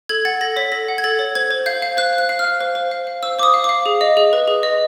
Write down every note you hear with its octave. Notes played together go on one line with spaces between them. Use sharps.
A4 G#6
F#5 A6
A4 A#6
C#5 B6
A4 A#6
F#5
G#6
A4 A6
C#5
C5 G#6
C5
F5 G6
F5
C5 F#6
C5
F#6
F5
F6
F5
C5
C5
F5
F5
C5 E6
C5 D6 D#6
F5
F5 D6
G#4
D#5
G#4
B4
G#4
D#5